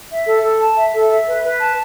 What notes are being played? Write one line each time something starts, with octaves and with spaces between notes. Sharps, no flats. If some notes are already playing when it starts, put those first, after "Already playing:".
E5
A4
A4
A5
E5
A4
E5
B4
B4
A5